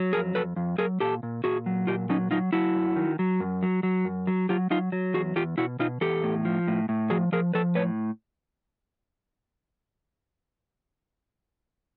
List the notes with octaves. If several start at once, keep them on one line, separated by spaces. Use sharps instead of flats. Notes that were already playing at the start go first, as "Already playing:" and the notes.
Already playing: F#3
F2 G#4 A#4
F2 A4 B4
F2
F#3 G#4 A#4
A#2 G4 A4
A#2
A#2 F#4 G#4
F#3
A#2 F4 G4
F#3 C#4 D#4
F#3 D#4 F4
F#3 E4 F#4
F#2
D#3
F#3
F#2
F#3
F#3
F#2
F#3
F#3 F4 G4
F#3 D#4 F4
F#3
E2 F#4 G#4
E2 F4 G4
B2 E4 F#4
B2 D#4 F4
E2 G4 A4
A2
F3
A2
A2
F3 F#4 G#4
F3 G#4 A#4
F3 A4 B4
A2 B4 C#5